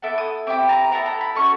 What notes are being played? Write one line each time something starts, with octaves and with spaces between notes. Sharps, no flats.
B3 E4 A4 D6
D#6
C4 E4 G4 D6
A#5
B3 E4 A4 A#5
A#5
B5
A3 C#4 F#4 C#6